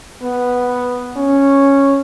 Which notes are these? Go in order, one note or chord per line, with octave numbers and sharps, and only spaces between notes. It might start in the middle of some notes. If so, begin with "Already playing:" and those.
B3
C#4